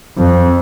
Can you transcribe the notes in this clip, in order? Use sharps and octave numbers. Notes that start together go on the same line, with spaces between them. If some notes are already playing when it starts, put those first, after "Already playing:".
F2